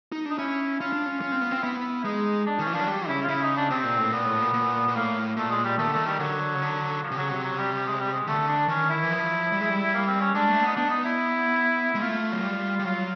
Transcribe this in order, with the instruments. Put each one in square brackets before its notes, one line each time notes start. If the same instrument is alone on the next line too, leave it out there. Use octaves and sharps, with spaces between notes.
[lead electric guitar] D#4
[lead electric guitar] D4 [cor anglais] D#4
[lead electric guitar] C#4 [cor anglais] E4
[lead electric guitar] C#4 [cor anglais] F4
[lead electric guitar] D4
C#4
C#4
C4
B3
C4
[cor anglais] F4
[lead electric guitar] B3 [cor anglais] E4
[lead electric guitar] G#3 [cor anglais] D#4
[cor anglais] D4
[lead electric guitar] D#3 [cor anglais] C#4
[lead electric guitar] E3
[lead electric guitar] F3 [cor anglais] D4
[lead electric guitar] F#3
G3
[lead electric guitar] C#3 [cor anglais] E4
[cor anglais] F4
[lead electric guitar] C#3 [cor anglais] E4
[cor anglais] D#4
D4
[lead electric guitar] C3 [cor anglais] C4
[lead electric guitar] A#2
A2
[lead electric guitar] A#2 [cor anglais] B3
[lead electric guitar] A2
A#2
A#2
A#2
[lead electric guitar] A2 [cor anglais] A#3
[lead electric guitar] A#2 [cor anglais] A3
[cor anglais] G#3
G3
[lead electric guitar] D#3 [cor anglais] A3
[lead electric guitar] D3
[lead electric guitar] D#3 [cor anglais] A3
[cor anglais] G3
[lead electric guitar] D3 [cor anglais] F#3
[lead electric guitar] C#3
D3
[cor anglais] F3
[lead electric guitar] C3
[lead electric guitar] C#3 [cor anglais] F#3
[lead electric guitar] C3 [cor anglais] F#3
[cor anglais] F#3
G3
G3
G#3
G3
G#3
[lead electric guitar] D3 [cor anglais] A3
[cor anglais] D4
[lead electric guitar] D#3 [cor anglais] C#4
[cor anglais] E4
[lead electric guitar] E3
F3
G3
G#3
G3
[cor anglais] A#3
C4
C#4
[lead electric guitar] G#3 [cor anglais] D4
[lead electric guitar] A3
[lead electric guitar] B3 [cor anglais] D#4
[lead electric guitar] B3 [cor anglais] D4
[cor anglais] D#4
E4
[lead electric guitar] G#3
[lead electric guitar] A3 [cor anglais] F4
[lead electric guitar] F#3
G3
G3
[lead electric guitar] F#3 [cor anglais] F4